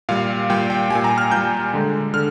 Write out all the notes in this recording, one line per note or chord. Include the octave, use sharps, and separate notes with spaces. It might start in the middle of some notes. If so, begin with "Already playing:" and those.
A#2 G3 F5
A#2 G3 G5
G5
A#2 G3 G#5
A#5
F6
A#2 G3 G6
D3 G#3
D3 F6